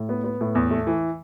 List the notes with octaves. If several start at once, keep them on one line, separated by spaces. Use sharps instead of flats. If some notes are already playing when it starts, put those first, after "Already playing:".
Already playing: A2
B3
B3
A2
E2
A3
E3